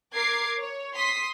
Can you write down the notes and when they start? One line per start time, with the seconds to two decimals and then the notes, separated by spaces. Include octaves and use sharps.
0.15 A#4 D6 G#6 C7
0.60 C#5
0.95 C6 D#6 B6